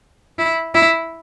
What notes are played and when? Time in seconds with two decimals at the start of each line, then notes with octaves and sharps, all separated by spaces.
0.38 E4
0.74 E4